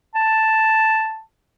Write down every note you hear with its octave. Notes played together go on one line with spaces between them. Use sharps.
A5